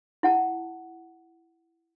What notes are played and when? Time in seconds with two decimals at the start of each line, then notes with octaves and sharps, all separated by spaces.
0.23 E4 F#5 A5